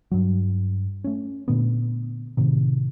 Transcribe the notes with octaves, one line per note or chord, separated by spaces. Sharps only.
G2 F#3
A3 C#4
A#2 D3 A3 B3
A2 C3 D#3